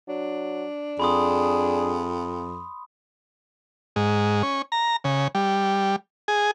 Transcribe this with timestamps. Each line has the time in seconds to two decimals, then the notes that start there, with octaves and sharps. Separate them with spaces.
0.08 F#3 D4
1.00 F2 G#4 B5 C6 D#6
3.96 G#2
4.43 C#4
4.72 A#5
5.04 C#3
5.35 G3
6.28 G#4